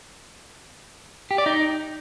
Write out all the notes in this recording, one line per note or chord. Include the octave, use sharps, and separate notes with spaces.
G4
D5
D#4